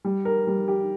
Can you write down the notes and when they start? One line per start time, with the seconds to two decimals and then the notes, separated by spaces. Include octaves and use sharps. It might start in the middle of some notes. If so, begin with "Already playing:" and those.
0.05 G3
0.25 A#4
0.47 G3
0.68 G4